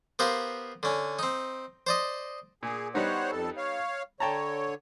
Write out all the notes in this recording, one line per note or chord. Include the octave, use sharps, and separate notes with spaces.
B3 G4 A#4 C5 F5
D3 C#4
C4 D#4
C5 D5 D#5
A#2 G#4
G3 B3 D#4 C5 C#5 F#5
F2 A4
C#5 F5
D3 C#5 G5 A5 A#5